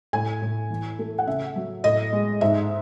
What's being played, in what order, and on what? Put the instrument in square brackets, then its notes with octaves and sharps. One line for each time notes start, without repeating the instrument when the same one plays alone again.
[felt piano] A2 G#5
A2
E3
A3
F#5
C#3 E5
F#3
A2 D#5
G#3
G#2 E5